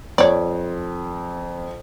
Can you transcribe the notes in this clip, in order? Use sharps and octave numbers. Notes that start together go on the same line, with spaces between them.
F2 C#5 D5